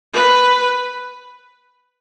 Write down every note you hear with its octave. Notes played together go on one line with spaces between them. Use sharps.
B4